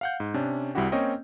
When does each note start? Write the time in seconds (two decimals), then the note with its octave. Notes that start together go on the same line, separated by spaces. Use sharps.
0.01 F5 F#5 G6
0.20 G#2
0.34 C3 C#4 D4
0.75 C2 G3 C4 E4 F#4 G4
0.92 A#3 C4 C#4 C#5 D#5 G5